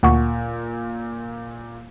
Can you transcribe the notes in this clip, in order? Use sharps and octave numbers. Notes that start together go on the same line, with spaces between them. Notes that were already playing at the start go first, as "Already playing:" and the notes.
D2 A#2 F#5 C#6